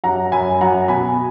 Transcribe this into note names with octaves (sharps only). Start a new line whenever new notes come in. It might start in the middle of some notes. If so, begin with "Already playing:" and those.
F#2 F#5 A#5
F#2 G#5 B5
F#2 F#5 A#5
B2 G#5 B5